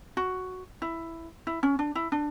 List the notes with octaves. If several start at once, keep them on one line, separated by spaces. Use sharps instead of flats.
F#4
E4
E4
C#4
D4
E4
D4